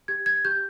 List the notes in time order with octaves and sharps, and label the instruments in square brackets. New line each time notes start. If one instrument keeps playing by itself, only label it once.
[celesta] G4 G#6
G#6
G4 G6